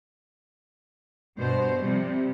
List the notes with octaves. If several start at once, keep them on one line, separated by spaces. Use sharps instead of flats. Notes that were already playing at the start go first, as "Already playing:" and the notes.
G2 B2 C5
C3 F3 G3